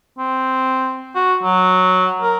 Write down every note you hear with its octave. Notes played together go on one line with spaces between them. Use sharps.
C4
F#4
F#3
A#4